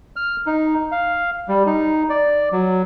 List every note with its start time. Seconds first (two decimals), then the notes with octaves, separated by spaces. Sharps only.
0.16 F6
0.47 D#4
0.92 F5
1.48 G3
1.66 D#4
2.09 D5
2.52 F#3